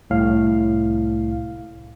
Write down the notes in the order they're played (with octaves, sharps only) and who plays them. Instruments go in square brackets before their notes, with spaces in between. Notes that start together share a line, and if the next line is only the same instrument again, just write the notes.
[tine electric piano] C2 A2 F5